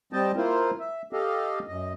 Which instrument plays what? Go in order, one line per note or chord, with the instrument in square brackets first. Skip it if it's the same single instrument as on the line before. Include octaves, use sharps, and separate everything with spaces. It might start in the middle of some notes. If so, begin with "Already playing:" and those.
[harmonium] G3 C4 D#5 G5 A5
A#3 E4 F4 A#4 C5
E5
G4 A4 D#5 F5
F#2 D#5